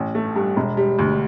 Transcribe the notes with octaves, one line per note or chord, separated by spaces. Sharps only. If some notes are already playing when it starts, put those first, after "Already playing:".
Already playing: A1
A3
G2
E1
G3
D2